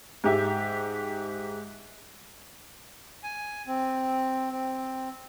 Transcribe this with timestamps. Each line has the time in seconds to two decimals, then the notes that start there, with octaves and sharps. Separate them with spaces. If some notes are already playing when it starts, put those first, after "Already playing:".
0.24 G#2 G4 E5
3.23 G#5
3.67 C4
4.52 C4